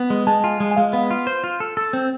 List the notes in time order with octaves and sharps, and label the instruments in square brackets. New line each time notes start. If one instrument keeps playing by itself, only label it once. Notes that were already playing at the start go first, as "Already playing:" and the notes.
Already playing: [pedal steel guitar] B3
G#3
[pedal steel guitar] G#3 [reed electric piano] A5
[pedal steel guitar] F4 [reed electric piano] G#5
[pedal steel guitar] G#3
[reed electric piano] G#5
[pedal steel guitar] G#3 [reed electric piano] F5
[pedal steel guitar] B3
F4
C5
F4
A4
A4
C4